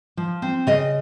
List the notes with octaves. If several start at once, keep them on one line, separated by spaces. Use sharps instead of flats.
F3
C4
C#3 D#5